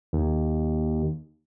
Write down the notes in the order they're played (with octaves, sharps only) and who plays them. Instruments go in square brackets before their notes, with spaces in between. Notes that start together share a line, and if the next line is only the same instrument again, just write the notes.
[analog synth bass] D#2